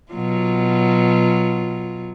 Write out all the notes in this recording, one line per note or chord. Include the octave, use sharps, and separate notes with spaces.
B2 F#3 F4